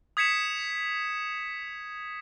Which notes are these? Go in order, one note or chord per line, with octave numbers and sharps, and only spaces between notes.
D#6 G#6 B6 C#7 E7